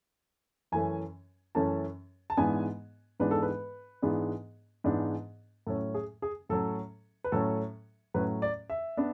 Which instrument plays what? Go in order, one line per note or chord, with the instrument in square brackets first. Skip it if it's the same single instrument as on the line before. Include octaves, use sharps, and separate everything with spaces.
[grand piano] F#2 E3 A3 C#4 G#5
F#2 E3 A3 C#4 A5
A5
G#2 E3 G#3 B3 D4 G#5
G#2 E3 G#3 B3 D4 B4
A4
B4
G#2 E3 G#3 B3 D4
G#2 E3 G#3 B3 D4
A2 F#3 C#4 A4
G#4
G#4
A2 F#3 C#4 A4
B4
A2 F#3 C#4 A4
A2 F#3 C#4 B4
D5
E5
B3 D4